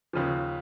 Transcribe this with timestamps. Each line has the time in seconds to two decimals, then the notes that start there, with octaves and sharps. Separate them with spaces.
0.13 D#2 C#3 F3